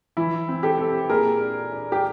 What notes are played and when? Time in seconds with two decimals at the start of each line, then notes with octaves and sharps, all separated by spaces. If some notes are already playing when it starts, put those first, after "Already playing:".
0.17 E3 E4
0.49 C4
0.63 G4 A4
0.78 C4
1.10 A#2 G#4 A#4
1.41 D4
1.72 D4
1.92 G4